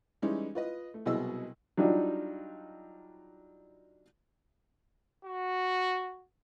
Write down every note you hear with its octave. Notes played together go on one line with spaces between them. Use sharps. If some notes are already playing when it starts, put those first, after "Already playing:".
E3 G3 G#3 C#4 D#4 E4
F4 B4 D#5
A3
C2 B2 F#3 G#4 D#5 E6
F#3 G3 D4 D#4 F4
F#4